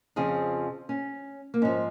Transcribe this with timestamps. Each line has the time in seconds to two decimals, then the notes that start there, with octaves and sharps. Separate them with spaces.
0.16 F2 C#3 F3 G#4
0.89 C#4
1.54 A#3
1.62 G#2 F3 C#4